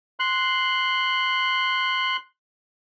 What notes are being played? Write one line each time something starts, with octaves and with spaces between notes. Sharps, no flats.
C6 F#6